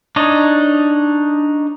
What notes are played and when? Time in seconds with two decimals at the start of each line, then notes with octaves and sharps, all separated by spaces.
0.16 D4 D#4 C#5 D#5